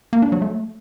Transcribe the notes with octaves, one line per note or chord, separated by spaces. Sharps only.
A#3
D4
F#3
A3